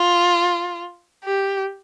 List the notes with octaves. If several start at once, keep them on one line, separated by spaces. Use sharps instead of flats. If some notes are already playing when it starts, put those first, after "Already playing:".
Already playing: F4
G4